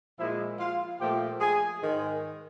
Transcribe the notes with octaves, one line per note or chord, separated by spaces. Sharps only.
A#2 F3 G#3 E4 E5
F4 F5
A#2 F3 A3 G4 G5
G#4 G#5
G#2 D#3 G#3